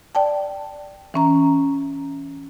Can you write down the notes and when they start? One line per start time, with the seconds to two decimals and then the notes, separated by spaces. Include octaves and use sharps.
0.15 D5 G5 A5
1.14 E3 C#4 A#5